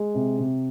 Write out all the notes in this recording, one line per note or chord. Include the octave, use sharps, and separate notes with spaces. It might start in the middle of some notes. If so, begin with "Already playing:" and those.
Already playing: G#3
C3
C3